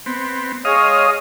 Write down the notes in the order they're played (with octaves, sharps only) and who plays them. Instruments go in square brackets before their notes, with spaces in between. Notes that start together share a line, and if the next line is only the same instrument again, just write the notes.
[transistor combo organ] B3 C4
[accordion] G#3 C#5 [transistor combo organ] D#5 F5 D#6